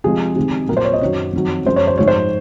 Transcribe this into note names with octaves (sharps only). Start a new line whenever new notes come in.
C3 F3 G#3 G#4
C3 D#3 G#3
A#2 F#3 A#4
C5
C#5
D#5
F#2 D#3 F#3 C#5
F2 D#3 F#3
F#2 F3 G#3 C5
C#5
C5
G#2 F3 G#3 C#5
C5